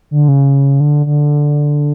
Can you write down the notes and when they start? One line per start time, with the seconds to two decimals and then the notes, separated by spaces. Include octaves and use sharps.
0.11 D3
0.28 C#3
0.80 D3
1.06 D3